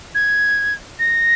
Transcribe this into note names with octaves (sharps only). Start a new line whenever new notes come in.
G#6
A#6